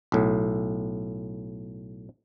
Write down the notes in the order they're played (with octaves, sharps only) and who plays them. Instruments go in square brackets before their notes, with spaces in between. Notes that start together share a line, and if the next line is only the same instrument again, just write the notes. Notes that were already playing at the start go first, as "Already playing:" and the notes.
[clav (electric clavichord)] B1 A2